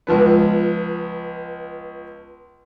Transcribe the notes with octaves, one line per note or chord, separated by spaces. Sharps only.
C#2 F3 B3